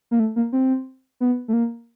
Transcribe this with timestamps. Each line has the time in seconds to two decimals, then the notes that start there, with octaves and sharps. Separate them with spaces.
0.11 A#3
0.19 A3
0.36 A#3
0.53 C4
1.20 B3
1.48 A3
1.53 A#3